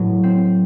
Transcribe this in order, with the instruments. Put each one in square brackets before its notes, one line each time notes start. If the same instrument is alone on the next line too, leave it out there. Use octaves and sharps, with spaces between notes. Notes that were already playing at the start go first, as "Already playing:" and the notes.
Already playing: [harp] A2 F#3
C4